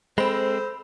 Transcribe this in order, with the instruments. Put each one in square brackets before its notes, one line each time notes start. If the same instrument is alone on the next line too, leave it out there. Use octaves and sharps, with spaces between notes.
[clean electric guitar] G#3 C4 [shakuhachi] A4 [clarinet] C5 [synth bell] B5